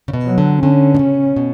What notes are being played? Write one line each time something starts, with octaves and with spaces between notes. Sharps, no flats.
C#3
B2
F#3
D3
D3 C#4
B2
C#3
B2